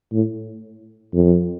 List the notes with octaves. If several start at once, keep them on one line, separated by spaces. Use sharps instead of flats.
A2
F2